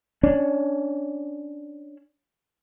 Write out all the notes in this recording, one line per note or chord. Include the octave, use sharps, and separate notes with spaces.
C#4 D4